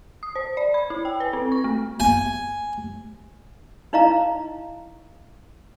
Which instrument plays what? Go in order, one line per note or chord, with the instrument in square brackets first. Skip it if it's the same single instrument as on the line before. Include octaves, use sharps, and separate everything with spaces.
[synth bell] D#6
C5
D5
B5
E4
G5
B4
C4
C#6
A3
[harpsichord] G#5
[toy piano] D#4 E4 D#5 F5 A#5